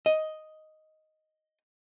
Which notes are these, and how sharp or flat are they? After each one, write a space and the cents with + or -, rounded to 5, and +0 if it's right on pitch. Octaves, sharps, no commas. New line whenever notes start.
D#5 +5